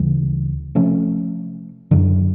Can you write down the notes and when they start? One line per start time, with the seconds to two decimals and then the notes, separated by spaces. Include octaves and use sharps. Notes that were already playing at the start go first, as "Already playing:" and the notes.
Already playing: D2 C#3 E3 G3
0.75 C3 F3 A3 C#4
1.91 F#2 D3 F#3